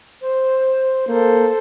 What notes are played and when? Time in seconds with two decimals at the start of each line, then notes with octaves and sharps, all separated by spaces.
0.22 C5
1.07 A#3 A4 C5